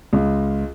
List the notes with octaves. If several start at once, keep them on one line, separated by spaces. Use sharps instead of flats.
C#2